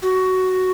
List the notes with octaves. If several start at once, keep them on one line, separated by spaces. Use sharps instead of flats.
F#4